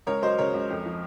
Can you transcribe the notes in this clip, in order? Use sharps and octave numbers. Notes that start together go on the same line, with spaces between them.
C#2 A#4 C#5
F#3 C5 D#5
C#3 A#4 C#5
C#2
F2
F3